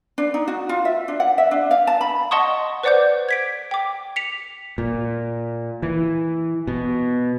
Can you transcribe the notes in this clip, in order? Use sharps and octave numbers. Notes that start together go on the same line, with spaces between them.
D4
D#4
F#4
F4
E5
D4
F#5
E5
D4
F5
A5
B5
D#5 F#5 A5 C6 C#6 D#6
B4 C5 D5 F#5 D6 G6
G#6 B6 D7
G5 D6
B6 C#7 F7
A#2
E3
B2